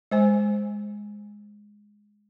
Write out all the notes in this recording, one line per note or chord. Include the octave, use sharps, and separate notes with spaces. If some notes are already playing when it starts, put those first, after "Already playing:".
G#3 C5 G#5